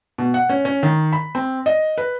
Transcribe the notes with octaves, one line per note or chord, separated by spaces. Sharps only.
B2
F#5
C#4
C#4
D#3
B5
C4
D#5
B4